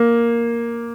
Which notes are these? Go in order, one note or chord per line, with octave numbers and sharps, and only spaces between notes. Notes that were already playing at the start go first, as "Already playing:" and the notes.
Already playing: A#3